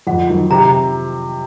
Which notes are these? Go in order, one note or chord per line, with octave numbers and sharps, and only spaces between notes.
F2 F#5
D#3 F#3
C3 A#5